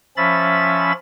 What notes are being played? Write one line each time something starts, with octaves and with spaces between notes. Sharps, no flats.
F3 C#4 E5 B5 A6